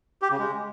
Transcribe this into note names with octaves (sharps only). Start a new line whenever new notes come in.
G4
C#3
G#3